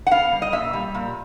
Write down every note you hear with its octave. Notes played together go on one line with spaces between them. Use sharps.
F#5
B3 F5
G3
D#5
A#2 E5
G3
A#2